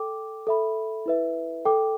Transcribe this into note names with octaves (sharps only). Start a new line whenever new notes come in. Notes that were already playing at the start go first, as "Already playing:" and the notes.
Already playing: A4 G5 D6
A4 E5 B5
E4 B4 E5
A4 G5 D6